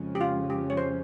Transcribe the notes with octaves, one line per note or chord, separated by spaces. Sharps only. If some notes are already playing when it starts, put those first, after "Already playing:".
Already playing: F2 C#3 F3 G#3 C#4
G4
F4
G4
C#5
C5